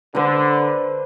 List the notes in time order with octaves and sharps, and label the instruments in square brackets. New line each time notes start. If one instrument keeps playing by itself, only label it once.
[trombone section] D3 [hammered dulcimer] B4 C5